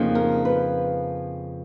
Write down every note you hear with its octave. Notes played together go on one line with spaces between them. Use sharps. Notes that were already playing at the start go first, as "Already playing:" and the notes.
Already playing: F2 C#3 F3 A#3 D#4
A#4
B4